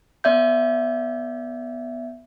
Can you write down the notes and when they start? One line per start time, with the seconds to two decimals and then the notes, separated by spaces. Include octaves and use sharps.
0.24 B3 D5 E5 G6